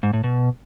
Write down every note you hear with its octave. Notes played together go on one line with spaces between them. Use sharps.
G#2
A2
B2